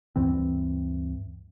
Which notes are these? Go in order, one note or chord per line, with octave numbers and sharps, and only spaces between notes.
D2 G2 E3 C4